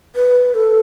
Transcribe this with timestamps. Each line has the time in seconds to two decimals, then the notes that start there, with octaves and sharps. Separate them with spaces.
0.15 B4
0.54 A4